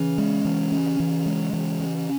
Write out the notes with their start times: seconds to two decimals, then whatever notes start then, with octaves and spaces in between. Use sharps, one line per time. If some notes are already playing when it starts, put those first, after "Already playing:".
Already playing: C#3 E3
0.18 G#3
0.45 E3
0.72 C#4
1.00 E3
1.26 G#3
1.53 E3
1.80 C#4